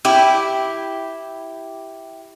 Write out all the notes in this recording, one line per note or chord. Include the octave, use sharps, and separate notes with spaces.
E4 G4